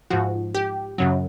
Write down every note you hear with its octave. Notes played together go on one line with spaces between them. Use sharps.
G#2 F3 F#4
G4
F#2 C#3 F#3